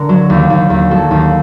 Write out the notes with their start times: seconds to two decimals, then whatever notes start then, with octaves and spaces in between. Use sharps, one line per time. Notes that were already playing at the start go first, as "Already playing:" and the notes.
Already playing: D3 A#4
0.09 F#3
0.30 D#2
0.50 D#2
0.70 D#2
0.91 F#3 A4
1.11 D#2